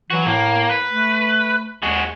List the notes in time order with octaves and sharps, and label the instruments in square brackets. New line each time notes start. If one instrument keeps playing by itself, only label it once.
[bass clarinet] E3 [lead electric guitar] F#3 F#4
[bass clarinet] A2 [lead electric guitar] A#3
[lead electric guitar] B4
[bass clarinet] A3
[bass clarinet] D#2 [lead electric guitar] G#3 F#4